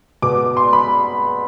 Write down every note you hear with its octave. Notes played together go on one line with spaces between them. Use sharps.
B2 D6
C6
B5